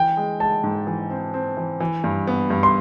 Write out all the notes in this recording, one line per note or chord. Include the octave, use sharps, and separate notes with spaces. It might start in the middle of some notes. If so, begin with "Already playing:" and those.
Already playing: E3 G5
G#3
G#3 A5
G#2
E3
C4
C4
E3
E3
G2
B3
G2
C6